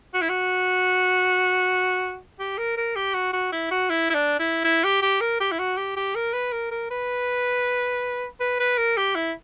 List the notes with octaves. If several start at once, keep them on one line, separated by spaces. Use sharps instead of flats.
F#4
E4
F#4
G4
A#4
A#4
G4
F#4
F#4
E4
F#4
E4
E4
D4
E4
E4
G4
G4
A#4
G4
E4
F#4
G4
G4
A#4
B4
A#4
A#4
B4
B4
B4
A#4
G4
E4